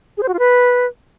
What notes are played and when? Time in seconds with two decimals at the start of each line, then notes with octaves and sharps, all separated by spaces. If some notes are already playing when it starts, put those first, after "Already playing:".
0.17 G#4
0.23 C5
0.28 F#4
0.34 F4
0.39 B4